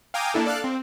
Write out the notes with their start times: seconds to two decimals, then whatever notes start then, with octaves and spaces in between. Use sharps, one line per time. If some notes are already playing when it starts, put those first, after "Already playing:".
0.14 F5 G5 G#5 A#5 D6 D#6
0.34 A#3 D4 E4 A4
0.45 A4 D5 F5 F#6
0.64 C4